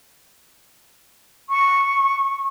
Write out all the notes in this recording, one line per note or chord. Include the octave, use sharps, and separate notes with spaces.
C#6